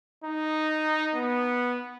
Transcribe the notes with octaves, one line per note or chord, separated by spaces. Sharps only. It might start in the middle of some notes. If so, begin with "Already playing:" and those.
D#4
B3